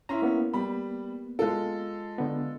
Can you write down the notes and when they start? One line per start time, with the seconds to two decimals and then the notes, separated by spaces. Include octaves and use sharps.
0.09 C#4 E4 A#5 C6
0.22 A#3 B3
0.53 G3 B5
1.39 G#3 F4 A4
2.18 D3 B3